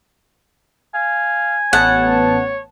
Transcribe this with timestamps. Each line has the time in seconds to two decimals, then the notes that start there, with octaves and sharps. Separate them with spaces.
0.95 F5 G#5
1.73 A1 B3 C#5 F#5 A5